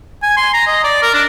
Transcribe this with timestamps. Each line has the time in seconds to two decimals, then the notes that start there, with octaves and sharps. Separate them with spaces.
0.22 G#5
0.37 C6
0.53 A#5
0.67 D#5
0.84 D5
1.02 A#4
1.14 D4